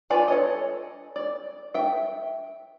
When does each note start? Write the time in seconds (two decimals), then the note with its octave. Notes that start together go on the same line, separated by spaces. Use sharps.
0.10 F4 B4 D5 G#5 A5
0.28 A4 C#5 D#5
1.16 D5
1.74 E5 G5